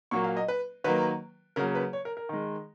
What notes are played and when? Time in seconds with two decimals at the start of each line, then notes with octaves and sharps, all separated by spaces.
0.11 A#2 F#3 A#3 C#6
0.24 F5
0.37 D#5
0.48 B4
0.84 D#3 F#3 A#3 B4
1.56 C#3 F#3 A#3 A#4
1.75 B4
1.93 C#5
2.05 A#4
2.17 A#4
2.29 D#3 G#3